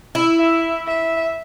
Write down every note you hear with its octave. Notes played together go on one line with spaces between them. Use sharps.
E4
E5
E5